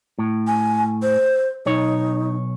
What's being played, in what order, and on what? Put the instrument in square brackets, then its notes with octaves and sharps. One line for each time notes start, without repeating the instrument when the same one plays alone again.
[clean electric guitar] A2
[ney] G#5
C5
[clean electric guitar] B1 C#5 [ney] D#4